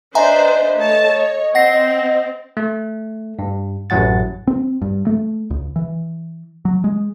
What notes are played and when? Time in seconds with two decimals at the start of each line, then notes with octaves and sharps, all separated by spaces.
0.15 D4 B4 C5 D#5 E5 G#5 A#5
0.77 A3 C#5 A5
1.09 C#5
1.55 C4 F#5 A#6 C7
2.57 A3
3.39 G2
3.90 A1 F#2 A2 F#3 F#5 A6
4.47 C4
4.82 G2
5.07 A3
5.50 C#2
5.76 E3
6.65 F#3
6.84 G#3